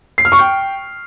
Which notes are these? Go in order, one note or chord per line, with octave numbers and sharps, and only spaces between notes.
C7
F6
C#6
G5